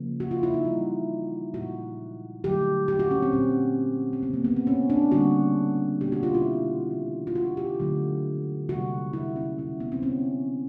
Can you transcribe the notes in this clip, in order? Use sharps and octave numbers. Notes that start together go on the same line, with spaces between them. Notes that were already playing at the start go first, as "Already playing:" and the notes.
Already playing: C#3 F3 A#3
F#4
F4
E4
D#4
C#3 E3 G3 A#3 F4
A#2 F3 G#3 F#4
D3 F#3 A3 G4
G4
F#4
C#4
C4
A#2 F#3 A3 C#4
C4
C#3 F3 A3 B3
A#3
B3
C4
C#4
D4
D3 G3 A#3 F#4
B2 G3 A#3 G4
F#4
F4
E4
C#3 E3 G3
F4
F#4
G4
D3 F#3 A3
C3 E3 G3 A#3 F#4
E4
C#4
B2 G#3 C#4
B3
C4
C#4